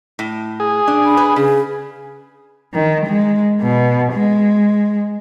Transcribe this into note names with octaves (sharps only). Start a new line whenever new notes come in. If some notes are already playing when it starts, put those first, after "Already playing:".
A2
G#4
D4
B5
B4
C#3 G#4
D#3
G#3
B2
G#3